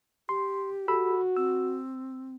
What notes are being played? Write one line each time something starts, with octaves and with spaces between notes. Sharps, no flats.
G4 C6
F#4 A4 B5 E6
C4 E6